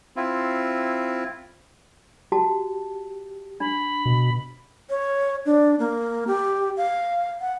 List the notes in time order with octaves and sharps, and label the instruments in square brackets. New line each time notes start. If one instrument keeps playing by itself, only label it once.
[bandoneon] C4 E4 F4
[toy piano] F#4 A5 [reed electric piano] G4
[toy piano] D4 [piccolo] B5
[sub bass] B2
[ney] C#5
D4
A#3
G4
F5
F#5